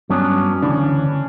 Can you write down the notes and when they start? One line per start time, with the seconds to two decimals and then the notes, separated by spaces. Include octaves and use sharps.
0.09 G2 F#3 B3 C#4 D4
0.62 D2 C#3 E3 D4